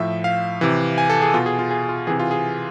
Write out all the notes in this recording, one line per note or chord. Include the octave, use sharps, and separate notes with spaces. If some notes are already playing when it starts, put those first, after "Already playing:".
Already playing: A2 F3 E5
F5
C3 E3
G#5
A4
G#4
B2 F4
G#4
F4
G#4
F4
C3 E3 G#4
F4
G#4